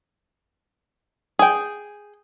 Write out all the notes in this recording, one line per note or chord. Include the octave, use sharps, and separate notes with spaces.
G#4 G5